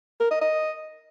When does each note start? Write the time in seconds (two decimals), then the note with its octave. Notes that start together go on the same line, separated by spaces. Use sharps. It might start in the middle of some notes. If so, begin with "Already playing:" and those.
0.20 A#4
0.31 D#5
0.41 D#5